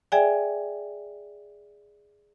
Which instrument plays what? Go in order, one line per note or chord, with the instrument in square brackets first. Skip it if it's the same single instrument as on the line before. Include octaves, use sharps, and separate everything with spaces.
[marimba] G#4 D5 E5 G5 G#5